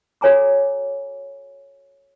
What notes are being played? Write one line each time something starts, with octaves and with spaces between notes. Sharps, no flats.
F#4 A4 C#5 G#5 A#5 D6